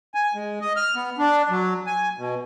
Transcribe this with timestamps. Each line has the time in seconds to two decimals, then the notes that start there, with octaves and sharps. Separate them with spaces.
0.15 G#5
0.35 G#3
0.61 D#5
0.76 F6
0.95 B3
1.18 D4
1.50 F#3
1.87 G#5
2.18 B2